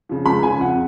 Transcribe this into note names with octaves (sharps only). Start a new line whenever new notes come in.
C#3 F3
C#2 B5
C#3 F3 G#5
F2 F#5